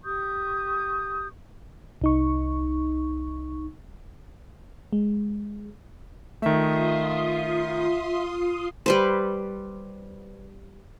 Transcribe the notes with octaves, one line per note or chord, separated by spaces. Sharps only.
G4 C#6 D#6 G6
C2 D#4 C#6
G#3
D#3 A3 F4 E5 C6 D#6
G3 B4 C5